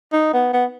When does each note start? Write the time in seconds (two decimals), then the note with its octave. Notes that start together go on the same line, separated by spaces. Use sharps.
0.13 D#4
0.34 B3
0.53 B3